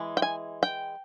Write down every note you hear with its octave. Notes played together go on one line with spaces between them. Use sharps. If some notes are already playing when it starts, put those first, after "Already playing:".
Already playing: E3 G#3
G5
G#5
G5